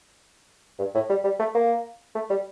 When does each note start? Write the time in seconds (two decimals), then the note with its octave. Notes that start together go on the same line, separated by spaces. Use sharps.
0.79 G2
0.95 A2
1.10 G3
1.24 G3
1.40 A3
1.55 A#3
2.15 A3
2.30 G3